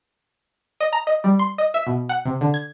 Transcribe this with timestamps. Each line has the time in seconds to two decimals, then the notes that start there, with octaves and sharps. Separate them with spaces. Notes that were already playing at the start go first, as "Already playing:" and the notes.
0.80 D#5
0.93 A#5
1.07 D#5
1.24 G3
1.39 C6
1.58 D#5
1.74 E5
1.87 B2
2.09 F#5
2.25 C3
2.41 D3
2.54 G#6